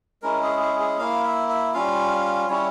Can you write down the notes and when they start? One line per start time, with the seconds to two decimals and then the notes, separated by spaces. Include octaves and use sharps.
0.23 G#3 C#4 E4 A#4
0.43 G#4
0.61 G#4
0.80 G#4
0.98 A#3 E4 F5
1.24 E5
1.49 E5
1.73 G3 C#4 F4 F5
2.49 G3 C#4 E4 C#5